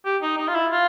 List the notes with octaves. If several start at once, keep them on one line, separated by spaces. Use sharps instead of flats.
G4
D#4
D#4
F4
E4
F4